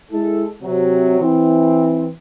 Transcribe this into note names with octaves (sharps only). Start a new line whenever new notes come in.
G#3 E4 A4
C3 F#3
E3 C4